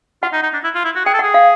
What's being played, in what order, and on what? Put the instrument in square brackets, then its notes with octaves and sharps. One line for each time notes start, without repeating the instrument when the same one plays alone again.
[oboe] F4 [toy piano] F#5
[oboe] D#4
D#4
D4
E4
F4
E4
F#4
[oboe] G#4 [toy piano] G5
[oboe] A4
[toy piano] F#5
[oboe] G#4
[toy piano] F5